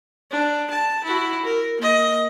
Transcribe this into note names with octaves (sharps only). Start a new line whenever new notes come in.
D4
A5
E4 F#4
A#4
A#3 D#5